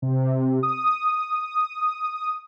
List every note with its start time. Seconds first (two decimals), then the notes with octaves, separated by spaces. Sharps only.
0.02 C3
0.63 D#6